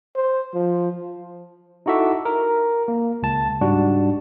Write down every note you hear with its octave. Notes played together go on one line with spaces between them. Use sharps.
C5
F3
D#4 E4 F#4 A4 E5 D6
A#4
A#3
C#2 A5
G#2 G3 D4 F#4